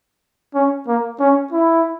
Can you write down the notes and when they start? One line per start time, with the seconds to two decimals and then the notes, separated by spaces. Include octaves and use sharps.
0.55 C#4
0.87 A#3
1.20 C#4
1.53 E4